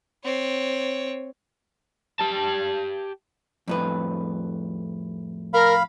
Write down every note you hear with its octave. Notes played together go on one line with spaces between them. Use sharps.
C4 C#5
G4 A5
F2 A2 B4
A#4 F5 B5